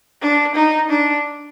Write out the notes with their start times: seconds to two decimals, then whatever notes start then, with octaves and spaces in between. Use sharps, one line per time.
0.22 D4
0.55 D#4
0.89 D4